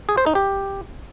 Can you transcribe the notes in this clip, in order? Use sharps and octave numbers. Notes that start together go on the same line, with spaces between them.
G#4
C5
D#4
G4